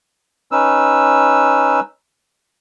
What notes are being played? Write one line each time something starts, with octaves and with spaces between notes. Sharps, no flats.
C#4 D#4 B4 E6